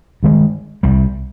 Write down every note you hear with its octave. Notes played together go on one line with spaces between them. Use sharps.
G2 D#3 G#3
C2 C3 G3